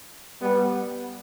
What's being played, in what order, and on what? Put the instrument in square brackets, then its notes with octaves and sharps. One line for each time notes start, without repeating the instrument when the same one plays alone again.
[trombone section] G3 B3